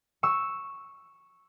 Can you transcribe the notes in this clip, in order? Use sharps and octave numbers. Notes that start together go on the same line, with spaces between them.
C#6 E6